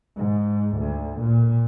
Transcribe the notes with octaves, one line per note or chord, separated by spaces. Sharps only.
G#2
D2
A#2